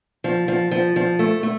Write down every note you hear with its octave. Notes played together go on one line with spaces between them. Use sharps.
F3
F3
F3
F3
A3
A3